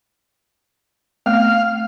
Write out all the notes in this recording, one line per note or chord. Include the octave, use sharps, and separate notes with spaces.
A3 B3 C4 F5